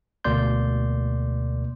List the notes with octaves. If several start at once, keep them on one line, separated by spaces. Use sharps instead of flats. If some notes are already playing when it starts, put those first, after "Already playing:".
D2 B2 A#3 D5 C6 G6